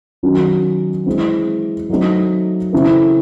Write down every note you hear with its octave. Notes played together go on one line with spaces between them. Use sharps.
D#3 F#3 C#4 F#4
E3 G#3 C4
F#3 A3 C4 D#4
C#3 E3 C4 E4 A4